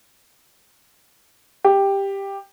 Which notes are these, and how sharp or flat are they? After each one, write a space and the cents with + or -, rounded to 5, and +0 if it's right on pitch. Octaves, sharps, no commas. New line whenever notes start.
G4 +5